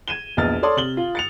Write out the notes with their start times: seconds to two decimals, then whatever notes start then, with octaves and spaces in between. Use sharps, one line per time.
0.08 G#6 D#7 E7 G7
0.37 E1 A#1 E2 D#5 F6 A6
0.62 A4 C#5 D5 C6 D#6
0.77 C3 F#7 G7
0.97 F4
1.15 A6 C#7 F7